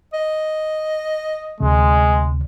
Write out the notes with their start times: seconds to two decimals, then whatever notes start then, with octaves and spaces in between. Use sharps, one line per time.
0.13 D#5
1.60 D2 C3 G#3